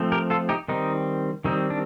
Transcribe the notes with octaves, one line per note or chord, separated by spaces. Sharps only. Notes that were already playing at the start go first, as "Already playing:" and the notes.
Already playing: F3 A3 C4
G4 A#4
F4 A4
D#4 G4
D#3 G3 C4 D#4
D#3 G3 C4 D#4
D4